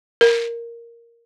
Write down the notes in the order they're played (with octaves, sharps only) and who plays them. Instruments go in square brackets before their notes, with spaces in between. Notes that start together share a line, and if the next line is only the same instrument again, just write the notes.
[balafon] A#4